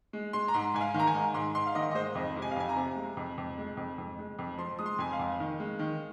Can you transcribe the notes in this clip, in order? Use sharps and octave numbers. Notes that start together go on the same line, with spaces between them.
G#3
G#3 C6
A#5
G#2 C6
G#2 G#5
F5
D#3
A#5
G#5
G#2
G#2 C6
G#2 C6
F5
D#3 D#5
D#5
G#3 C5
F2 D#5
C3
G#5
F5
F2 G#5
A#5
C3
G#3
F2
F2
G#3
F2
F2
G#3
F2
F3 C6
G#3 D#6
C6
F2 G#5
F5
F2
D#3
G#3
D#3